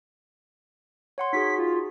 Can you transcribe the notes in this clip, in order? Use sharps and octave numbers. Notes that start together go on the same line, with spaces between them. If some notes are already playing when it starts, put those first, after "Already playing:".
C#5 F#5 C6
D#4 F#4 G#4 B6
F4